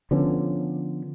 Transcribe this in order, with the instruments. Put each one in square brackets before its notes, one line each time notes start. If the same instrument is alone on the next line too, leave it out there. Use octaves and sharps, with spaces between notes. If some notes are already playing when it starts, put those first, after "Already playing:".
[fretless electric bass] D3 F3 B3 C#4